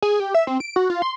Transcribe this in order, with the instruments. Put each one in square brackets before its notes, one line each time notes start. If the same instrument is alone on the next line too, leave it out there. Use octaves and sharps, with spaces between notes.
[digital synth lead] G#4
G4
E5
C4
D7
F#4
F4
C6